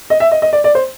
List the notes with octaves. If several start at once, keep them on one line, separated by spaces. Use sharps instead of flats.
D#5
E5
D#5
D#5
D5
D5
C5